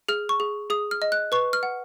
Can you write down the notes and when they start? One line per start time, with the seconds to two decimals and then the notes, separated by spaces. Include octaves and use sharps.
0.09 G#4 F6
0.29 C#6
0.40 G#4
0.70 G#4 D#6
0.91 F6
1.02 D#5
1.12 F#6
1.32 B4 C#6
1.53 F6
1.63 F#5